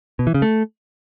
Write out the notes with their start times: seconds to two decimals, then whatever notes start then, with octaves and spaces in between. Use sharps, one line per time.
0.19 B2
0.27 E3
0.34 C#3
0.42 A3